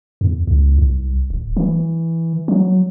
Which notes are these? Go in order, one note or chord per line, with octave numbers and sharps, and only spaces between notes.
E2
C#2
C2
D1
E3
F#3